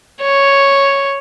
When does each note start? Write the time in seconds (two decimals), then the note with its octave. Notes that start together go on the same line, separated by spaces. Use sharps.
0.22 C#5